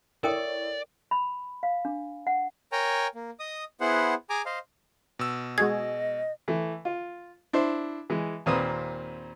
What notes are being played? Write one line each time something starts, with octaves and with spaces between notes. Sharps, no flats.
E4 A4 A#4 C#5 D5 G5 D#6
B5
F5
D4
F#5
A#4 C#5 G5 G#5 A#5
A#3
D#5 D#6
B3 E4 G#4 C5 F#5
G#4 G#5 A#5 D6
C5 D#5 F5
B2 E6
G#3 F#4 G#4 D#5 G#6
E3 A3
F4
D4 E4 C5
E3 G#3
D#2 A#2 C4 B4 C5 D#6